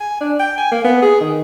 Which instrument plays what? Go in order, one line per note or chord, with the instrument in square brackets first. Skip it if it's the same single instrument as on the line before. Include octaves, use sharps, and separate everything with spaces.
[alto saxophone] G#5
D4
G5
G#5
A#3
B3
G#4
D#3